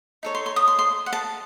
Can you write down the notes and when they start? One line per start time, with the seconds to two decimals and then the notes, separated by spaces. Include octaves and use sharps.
0.23 D#4 A4 C#5
0.35 C6
0.46 C6
0.56 D#6
0.68 C6
0.79 C6
1.06 F#5
1.13 A5